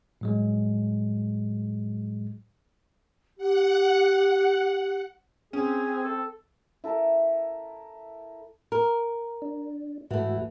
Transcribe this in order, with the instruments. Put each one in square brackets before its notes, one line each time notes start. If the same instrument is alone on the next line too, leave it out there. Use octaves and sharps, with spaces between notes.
[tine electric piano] A2 F#3 G#3
[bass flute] G4 [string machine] F#5
[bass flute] C4 [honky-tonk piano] C#4 [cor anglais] G#4
[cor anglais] A4
[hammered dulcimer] E4 A4 A#4
[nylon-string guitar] A#4
[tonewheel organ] D4
[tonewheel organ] G#2 F#4 [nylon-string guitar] E3 A3